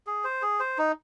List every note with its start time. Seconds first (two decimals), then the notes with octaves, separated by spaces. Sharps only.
0.07 G#4
0.24 C5
0.42 G#4
0.60 C5
0.78 D#4